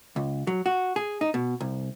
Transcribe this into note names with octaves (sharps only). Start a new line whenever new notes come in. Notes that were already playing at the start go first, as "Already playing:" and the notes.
C#2
F#3
F#4
G#4
D#4
B2
C2